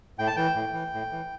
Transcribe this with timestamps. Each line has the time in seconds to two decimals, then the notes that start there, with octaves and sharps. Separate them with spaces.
0.19 A2 G5
0.27 A5
0.36 E3 G5
0.55 A2
0.74 E3
0.93 A2
1.11 E3